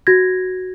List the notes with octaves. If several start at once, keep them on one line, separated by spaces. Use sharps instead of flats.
F#4 G#6 A#6